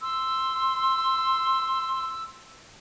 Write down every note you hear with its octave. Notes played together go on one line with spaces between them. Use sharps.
C6 E6